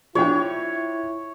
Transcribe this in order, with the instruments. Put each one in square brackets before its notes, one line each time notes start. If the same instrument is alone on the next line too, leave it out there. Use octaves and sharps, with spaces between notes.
[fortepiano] F3 D4 G5 [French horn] E4 [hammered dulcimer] C#5